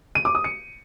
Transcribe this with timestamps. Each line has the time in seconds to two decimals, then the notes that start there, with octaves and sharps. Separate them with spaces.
0.15 D#7
0.25 D6
0.35 D#6
0.44 C#7